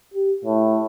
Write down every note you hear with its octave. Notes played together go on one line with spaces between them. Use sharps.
G4
A2